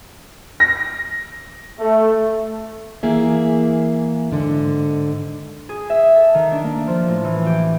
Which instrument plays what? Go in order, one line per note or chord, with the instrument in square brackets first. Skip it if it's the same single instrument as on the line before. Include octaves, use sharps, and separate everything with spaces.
[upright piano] A#6
[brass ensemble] A3
[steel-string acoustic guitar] E3 A#3 G#4 E5
G#2 D3
[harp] G#4
E5
A4
D#3
D4
A#3
F3
A2
E3
G4